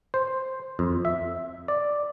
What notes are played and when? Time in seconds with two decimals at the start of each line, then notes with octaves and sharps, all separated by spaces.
0.14 C5
0.79 F2
1.05 E5
1.68 D5